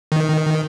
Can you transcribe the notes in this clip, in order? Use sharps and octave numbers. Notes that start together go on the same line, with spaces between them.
D#3